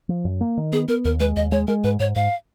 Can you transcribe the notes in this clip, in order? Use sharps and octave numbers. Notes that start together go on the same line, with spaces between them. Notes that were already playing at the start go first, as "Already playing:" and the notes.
F3
F#2
A#3
D#3
B3 G#4
B3 A#4
D#2 A#4
G#3 B4
D#2 D#5
G#3 C#5
G#3 A#4
G#2 B4
G#2 C#5
G#2 F5